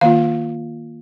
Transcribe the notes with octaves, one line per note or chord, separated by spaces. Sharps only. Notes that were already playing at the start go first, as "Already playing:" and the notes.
D#3 A#3 F4 F5